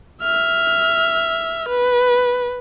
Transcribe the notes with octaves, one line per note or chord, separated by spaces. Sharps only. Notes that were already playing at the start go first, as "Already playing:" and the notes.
E5 F6
B4